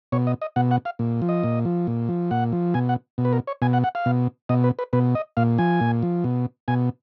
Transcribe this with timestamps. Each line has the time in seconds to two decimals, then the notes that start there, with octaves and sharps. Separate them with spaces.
0.12 B2 C#5
0.27 D#5
0.41 D#5
0.56 B2 F#5
0.71 F#5
0.85 F5
0.99 A#2
1.22 F3
1.29 D#5
1.43 A#2
1.65 F3
1.87 A#2
2.09 F3
2.31 A#2 F#5
2.52 F3
2.74 B2 G#5
2.89 F#5
3.18 B2
3.25 B4
3.33 A#4
3.47 C#5
3.62 B2 G#5
3.73 F#5
3.84 F#5
3.95 F5
4.06 B2
4.49 B2 D#5
4.64 B4
4.79 B4
4.93 B2 B4
5.15 D#5
5.37 A#2 F5
5.58 F3 G#5
5.81 A#2
6.03 F3
6.24 B2
6.68 B2 G#5